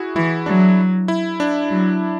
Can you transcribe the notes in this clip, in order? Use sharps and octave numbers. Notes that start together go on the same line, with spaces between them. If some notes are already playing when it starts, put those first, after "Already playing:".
Already playing: E4 F#4 G#4
E3 E4
F#3 D4
E4
D4
F#3